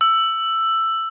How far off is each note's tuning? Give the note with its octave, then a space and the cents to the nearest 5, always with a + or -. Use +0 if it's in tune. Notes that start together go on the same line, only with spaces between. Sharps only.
E6 +10